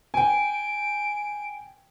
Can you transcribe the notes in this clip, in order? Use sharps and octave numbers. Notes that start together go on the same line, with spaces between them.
G5 G#5 D7